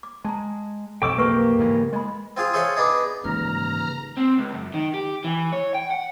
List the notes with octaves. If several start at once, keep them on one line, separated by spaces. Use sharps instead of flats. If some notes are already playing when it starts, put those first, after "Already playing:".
D6
G#3 A5 A#5
B1 F2 A4 D#5 G5 C#6 D6 E6
A#3 G4 B4 C#6
G#2 C#3 E3
G#3 D#5 B5
C4 F4 G#4 F5
G#4 A4 C5 C#5 E5 F5
B3 D4 D#4 G#4
D#1 G#2 C#3 E3 A#5 F6
C4
C#2
F#2
D#3
G4
E3
C#5
G5
F#5